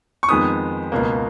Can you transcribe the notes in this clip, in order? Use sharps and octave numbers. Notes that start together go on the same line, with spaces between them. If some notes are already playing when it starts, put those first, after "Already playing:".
C#6
F2 D#3 G#3 B3 D#6
C#2 B2 A#3